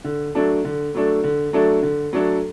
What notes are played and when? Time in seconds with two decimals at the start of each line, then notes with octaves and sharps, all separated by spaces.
0.04 D3
0.35 F#3 A3 D4 A4
0.65 D3
0.95 F#3 A3 D4 A4
1.24 D3
1.53 F#3 A3 D4 A4
1.83 D3
2.13 F#3 A3 D4 A4